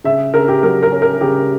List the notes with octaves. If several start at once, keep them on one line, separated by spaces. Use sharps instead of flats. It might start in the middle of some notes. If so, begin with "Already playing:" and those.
C#3 E5
C#3 A#4
G4
F#3 A#4
A#4
C#4
A#4
C#3 G4